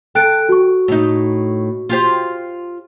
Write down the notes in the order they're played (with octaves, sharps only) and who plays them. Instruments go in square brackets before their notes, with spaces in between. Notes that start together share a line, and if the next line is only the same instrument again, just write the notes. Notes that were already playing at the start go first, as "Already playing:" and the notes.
[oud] A4 [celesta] G5 F#6 D7
[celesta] F#4 C#6
[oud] A2 D#4
F4 G4 C5